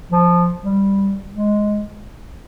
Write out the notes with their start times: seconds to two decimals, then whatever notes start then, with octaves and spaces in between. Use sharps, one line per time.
0.11 F3
0.64 G3
1.34 G#3